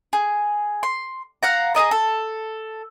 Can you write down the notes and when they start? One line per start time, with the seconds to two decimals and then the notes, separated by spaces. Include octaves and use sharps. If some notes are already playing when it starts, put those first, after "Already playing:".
0.13 G#4
0.83 C6
1.43 F5 F#5 A#5
1.74 G#4 B4 D#5 A#5
1.91 A4